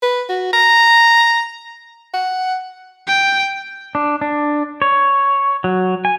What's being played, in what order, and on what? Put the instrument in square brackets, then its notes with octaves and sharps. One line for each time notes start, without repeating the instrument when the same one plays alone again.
[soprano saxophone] B4
F#4
A#5
F#5
[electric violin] G5
[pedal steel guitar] D4
D4
C#5
F#3
G#5